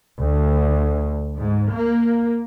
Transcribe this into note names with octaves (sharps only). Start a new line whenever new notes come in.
D2
G#2
A#3